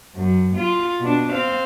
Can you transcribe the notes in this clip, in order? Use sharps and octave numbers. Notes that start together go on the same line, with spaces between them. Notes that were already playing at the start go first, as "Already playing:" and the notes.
F#2
F4
B2 D4
C4 F5